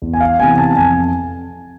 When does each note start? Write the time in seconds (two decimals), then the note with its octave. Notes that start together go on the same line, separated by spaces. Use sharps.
0.02 E2
0.14 G#5
0.20 F5
0.40 C3 E3 B3 G#5
0.55 G#5
0.58 A5
0.77 F2 G#5